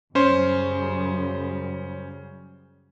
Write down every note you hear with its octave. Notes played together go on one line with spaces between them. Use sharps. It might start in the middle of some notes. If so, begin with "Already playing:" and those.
F#2 C#3 G3 C#4 C5